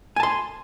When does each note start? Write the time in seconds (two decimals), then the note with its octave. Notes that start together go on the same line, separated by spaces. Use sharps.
0.16 G#5
0.20 A5
0.23 C6